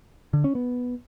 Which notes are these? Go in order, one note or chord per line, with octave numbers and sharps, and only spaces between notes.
D3
C#4
B3